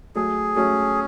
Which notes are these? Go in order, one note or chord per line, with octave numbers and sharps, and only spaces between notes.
F#3 A3 G#4
F#3 A3 C#4